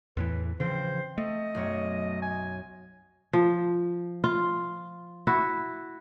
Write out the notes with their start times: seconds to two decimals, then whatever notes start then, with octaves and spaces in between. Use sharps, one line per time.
0.17 E2 A2 E3 B4
0.60 C#3 E3 F3 C4 C5
1.18 A3 D#5
1.55 B1 F#2 C#5
2.22 G#5
3.33 F3
4.24 F4
5.27 E4 F#4